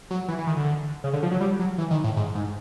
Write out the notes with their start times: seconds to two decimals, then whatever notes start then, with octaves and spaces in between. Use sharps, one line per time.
0.11 F#3
0.28 E3
0.39 E3
0.47 D#3
0.56 D3
1.04 C#3
1.13 D3
1.23 F3
1.31 F#3
1.41 G3
1.59 F#3
1.78 E3
1.91 D#3
2.04 A2
2.16 G#2
2.35 G#2